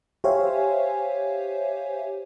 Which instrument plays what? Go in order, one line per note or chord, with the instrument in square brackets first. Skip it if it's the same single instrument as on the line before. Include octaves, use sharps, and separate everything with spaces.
[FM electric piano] G4 C5 C#5 E5 F5 G#5